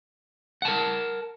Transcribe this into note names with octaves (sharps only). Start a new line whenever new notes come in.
A#4 F#5 A5